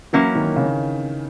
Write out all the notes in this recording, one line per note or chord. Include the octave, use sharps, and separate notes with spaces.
E3 F#3 A#3 C#4 E4
D#3
C#3